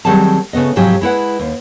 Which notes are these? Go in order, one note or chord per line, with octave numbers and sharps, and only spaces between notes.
D#3 F#3 G3 C4 G#4 A5
C#3 A3 B3 D#5
G#2 C3 F3 F#3 G4 G#5
G#3 E4 B4 F#5
D#2